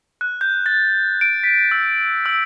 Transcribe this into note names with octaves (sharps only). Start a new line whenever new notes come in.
F#6
G6
A6
D7
B6
E6
E6